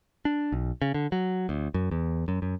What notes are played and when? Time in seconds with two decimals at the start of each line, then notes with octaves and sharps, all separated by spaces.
0.25 D4
0.52 B1
0.82 C#3
0.94 D3
1.12 F#3
1.49 D2
1.74 F#2
1.91 E2
2.28 F#2
2.42 F#2